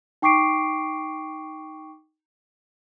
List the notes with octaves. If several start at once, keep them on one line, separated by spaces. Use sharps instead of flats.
D#4 G5 C#6 D6 C7 D7